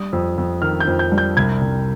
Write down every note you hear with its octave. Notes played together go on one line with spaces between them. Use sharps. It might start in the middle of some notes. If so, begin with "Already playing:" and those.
Already playing: G3 D#6
F2
F2
D#3 F6
G6
F2
G6
G3
G6
C2 G#6
C2